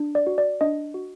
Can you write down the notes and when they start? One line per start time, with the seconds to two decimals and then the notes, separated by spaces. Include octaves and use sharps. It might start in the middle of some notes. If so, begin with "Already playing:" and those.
Already playing: D4
0.15 D5
0.27 F#4
0.38 D5
0.61 D4 D#5
0.94 F#4